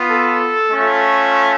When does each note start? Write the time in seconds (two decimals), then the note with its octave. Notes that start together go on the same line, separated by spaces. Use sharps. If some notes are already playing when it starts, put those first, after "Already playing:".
Already playing: B3 F4
0.10 A4
0.71 A3 C#4 F4